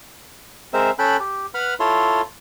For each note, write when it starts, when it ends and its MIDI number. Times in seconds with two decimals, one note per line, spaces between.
0.73 0.91 56
0.73 0.91 60
0.73 0.91 70
0.73 0.91 72
0.73 0.91 76
0.99 1.17 61
0.99 1.17 69
0.99 1.17 79
0.99 1.17 83
0.99 1.17 90
1.20 1.46 67
1.54 1.74 71
1.54 1.74 78
1.54 1.74 83
1.54 1.74 89
1.80 2.22 64
1.80 2.22 65
1.80 2.22 69
1.80 2.22 73
1.80 2.22 84